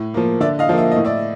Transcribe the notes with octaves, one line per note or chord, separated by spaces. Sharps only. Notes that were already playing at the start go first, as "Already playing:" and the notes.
Already playing: A2
F3 A#3
D3 D5 E5
D#5 F5
F3 A#3
E5
A2 D#5
D5 E5